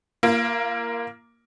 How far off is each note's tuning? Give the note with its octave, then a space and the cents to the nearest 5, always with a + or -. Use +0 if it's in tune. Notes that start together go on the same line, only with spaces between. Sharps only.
A#3 +0 F4 -40